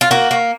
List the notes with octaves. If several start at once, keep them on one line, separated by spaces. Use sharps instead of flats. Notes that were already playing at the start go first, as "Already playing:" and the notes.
F4
A#3 F#4
A#3